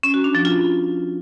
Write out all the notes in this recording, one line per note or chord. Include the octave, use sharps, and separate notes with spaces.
C#4
F#4
D4
F3
F4